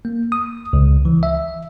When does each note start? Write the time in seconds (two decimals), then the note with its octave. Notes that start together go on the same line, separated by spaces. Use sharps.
0.05 A#3
0.32 D#6
0.73 C#2
1.05 E3
1.23 E5